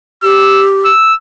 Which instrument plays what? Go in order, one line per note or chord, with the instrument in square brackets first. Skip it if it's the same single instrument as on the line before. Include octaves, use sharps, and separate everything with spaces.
[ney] G4 [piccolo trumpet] E6
[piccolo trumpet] E6